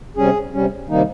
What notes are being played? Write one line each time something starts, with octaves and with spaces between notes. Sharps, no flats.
C3 G3 C#4 G#4
C3 G3 C#4
C3 D#3 G3 A#3 D#4